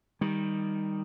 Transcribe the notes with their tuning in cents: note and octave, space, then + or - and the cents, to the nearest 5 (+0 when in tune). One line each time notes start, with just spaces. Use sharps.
D#3 +0 G3 +15